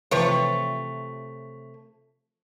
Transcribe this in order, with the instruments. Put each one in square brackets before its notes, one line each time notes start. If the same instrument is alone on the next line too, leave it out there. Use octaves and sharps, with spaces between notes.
[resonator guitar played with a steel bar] C3 A3 C#5 [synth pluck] E3 F3 B4